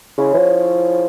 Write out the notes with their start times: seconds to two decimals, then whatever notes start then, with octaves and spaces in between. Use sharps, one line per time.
0.18 C#3 G#3 C#4 E4
0.33 E3
0.38 F3